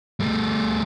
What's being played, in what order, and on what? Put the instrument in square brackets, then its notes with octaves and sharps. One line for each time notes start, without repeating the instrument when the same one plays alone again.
[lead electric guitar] G3 A3